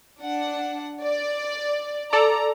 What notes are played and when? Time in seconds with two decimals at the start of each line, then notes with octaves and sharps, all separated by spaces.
0.22 D4 F#5
1.03 D5
2.13 A4 D5 A#5